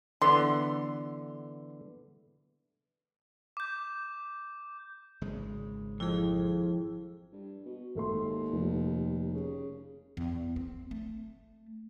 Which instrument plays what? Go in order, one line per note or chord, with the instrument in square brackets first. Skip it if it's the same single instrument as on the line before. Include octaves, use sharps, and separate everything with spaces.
[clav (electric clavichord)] D3 E3 B3 [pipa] C6
[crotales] D6 G6
[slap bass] G#1 C#3 G#3
[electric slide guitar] F2 [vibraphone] E4 G#4
[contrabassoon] G2
B2
[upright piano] G#1 A3 C6 [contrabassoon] D#2
[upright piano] F1
[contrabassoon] C#3
[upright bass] E2
C4
A3